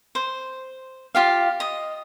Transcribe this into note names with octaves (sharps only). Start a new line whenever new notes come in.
C5
F4 G4 F5
D#5